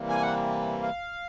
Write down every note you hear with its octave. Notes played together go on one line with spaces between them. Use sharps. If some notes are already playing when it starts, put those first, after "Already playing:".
Already playing: C3 E3 G3 A#3
G#5
F#5
F5